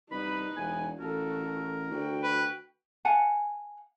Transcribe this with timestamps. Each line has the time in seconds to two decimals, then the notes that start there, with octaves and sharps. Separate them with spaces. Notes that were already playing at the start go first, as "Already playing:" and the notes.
0.11 C2 D#4 B4 B5
0.57 E1 G#5
1.00 A1 F#4 A4 A#4
1.91 D2 F#4 G5
2.23 B4
3.05 F5 F#5 G#5 A5